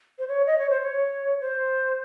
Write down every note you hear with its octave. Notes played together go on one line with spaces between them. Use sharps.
C5
C#5
D#5
C#5
C5
C#5
C5